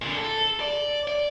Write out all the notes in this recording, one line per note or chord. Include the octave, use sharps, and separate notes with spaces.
A#2 D3
A4
D5
D5